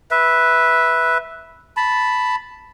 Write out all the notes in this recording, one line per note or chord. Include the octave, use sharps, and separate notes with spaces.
B4 E5
A5 B5